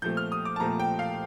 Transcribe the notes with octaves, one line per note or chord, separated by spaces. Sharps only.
A#2 F3 A3 C4 G6
F6
D#6
D6
A5
A#2 F3 A3 C4 A#5
G5
F5